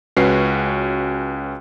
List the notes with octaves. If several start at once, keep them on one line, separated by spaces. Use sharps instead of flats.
C#2 C#4 F#4 B4 C7